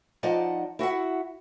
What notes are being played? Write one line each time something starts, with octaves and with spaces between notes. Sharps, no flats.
F3 D#4 D5 D#5 F#5 A5
E4 F#4 E5 F#5